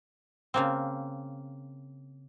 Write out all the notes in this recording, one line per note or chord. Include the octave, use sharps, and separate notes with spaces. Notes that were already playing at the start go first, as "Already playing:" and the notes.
C#3 A#3 C4